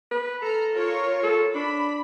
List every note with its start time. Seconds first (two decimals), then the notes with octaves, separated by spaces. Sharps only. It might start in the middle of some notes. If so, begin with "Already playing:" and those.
0.11 B4
0.42 A4 A#5 F6
0.73 F4 A#4 C#5
1.23 A4
1.55 D4 B5